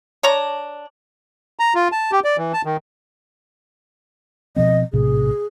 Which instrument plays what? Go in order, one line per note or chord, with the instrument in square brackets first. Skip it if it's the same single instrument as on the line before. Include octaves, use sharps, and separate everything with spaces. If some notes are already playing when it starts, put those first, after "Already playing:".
[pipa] D4 C#5 A#5
[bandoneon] A#5
F4
A5
G4
D5
E3
A5
D#3
[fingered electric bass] B2 F3 C4 [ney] D#5
[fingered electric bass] A#1 A2 C3 [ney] G#4